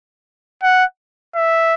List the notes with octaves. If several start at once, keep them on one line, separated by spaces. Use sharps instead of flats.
F#5
E5